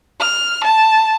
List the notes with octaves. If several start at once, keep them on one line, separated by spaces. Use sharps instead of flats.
F6
A5